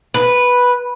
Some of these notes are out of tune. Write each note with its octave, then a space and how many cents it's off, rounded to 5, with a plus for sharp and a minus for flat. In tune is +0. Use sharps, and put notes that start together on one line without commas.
B4 -5